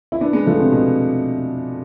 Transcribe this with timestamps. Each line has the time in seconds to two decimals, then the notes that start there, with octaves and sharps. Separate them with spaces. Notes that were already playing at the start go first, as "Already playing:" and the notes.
0.12 E4
0.21 B3 D4
0.33 G#3 B3
0.47 F3 A3
0.59 C3
0.72 B2